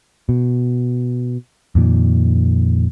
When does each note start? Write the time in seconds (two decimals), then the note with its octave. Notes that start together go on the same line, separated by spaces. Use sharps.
0.29 B2
1.75 F2 A#2 D#3